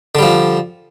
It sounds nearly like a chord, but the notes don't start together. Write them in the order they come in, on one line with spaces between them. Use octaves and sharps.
D3 G3 F3